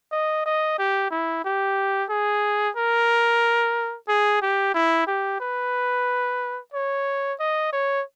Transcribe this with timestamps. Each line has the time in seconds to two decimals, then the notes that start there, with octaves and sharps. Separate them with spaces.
0.12 D#5
0.46 D#5
0.79 G4
1.11 E4
1.45 G4
2.10 G#4
2.77 A#4
4.08 G#4
4.42 G4
4.74 E4
5.07 G4
5.40 B4
6.74 C#5
7.40 D#5
7.72 C#5